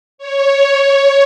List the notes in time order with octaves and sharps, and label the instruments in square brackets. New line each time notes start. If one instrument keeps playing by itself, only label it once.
[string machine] C#5